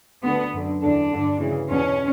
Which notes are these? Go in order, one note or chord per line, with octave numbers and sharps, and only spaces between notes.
D2 D3 B3
F#2 D3
E2 D3 D4
G2 D3
D2 C#3 E3
E2 B2 C#4